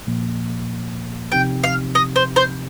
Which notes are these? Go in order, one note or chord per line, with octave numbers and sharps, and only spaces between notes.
A#2 F3 A#3
C3 F3 C4 D#4 G4 G5
F5
D#5
C5
C5